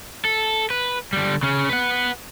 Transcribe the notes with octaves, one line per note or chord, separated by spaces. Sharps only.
A4
B4
D3 G3
C#3 C#4
B4 F#5